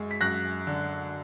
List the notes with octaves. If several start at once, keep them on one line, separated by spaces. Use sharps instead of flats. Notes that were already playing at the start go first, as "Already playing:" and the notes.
Already playing: F#2 G#3
B6
F#2 F#6 A#6
D3